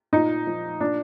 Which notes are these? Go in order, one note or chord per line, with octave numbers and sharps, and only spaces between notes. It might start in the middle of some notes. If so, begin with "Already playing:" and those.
A#2 D#4
F3
A#2 D4